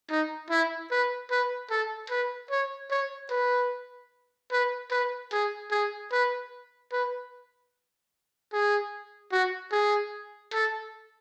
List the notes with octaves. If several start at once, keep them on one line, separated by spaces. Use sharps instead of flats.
D#4
E4
B4
B4
A4
B4
C#5
C#5
B4
B4
B4
G#4
G#4
B4
B4
G#4
F#4
G#4
A4